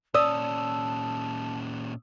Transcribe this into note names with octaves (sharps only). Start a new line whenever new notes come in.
A#2 C#4 D5 A5 D#6 E6